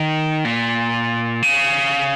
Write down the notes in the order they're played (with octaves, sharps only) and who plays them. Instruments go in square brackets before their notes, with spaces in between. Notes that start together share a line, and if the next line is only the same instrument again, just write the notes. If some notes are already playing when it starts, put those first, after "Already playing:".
Already playing: [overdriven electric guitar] D#3
A#2
C#3